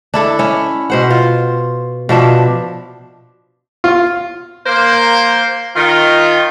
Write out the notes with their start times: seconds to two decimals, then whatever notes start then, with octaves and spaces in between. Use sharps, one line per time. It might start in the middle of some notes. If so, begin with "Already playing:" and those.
0.14 D4 E4 A4
0.39 C#4 E4
0.90 B2 C5 F#5
1.11 F4
2.09 B2 F3 D4 E5
3.84 F4
4.66 A#3 C5
5.76 D#3 F4